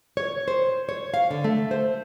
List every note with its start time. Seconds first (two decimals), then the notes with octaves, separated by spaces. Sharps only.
0.17 C#5
0.48 C5
0.89 C#5
1.14 F5
1.31 D3
1.44 A3
1.71 C5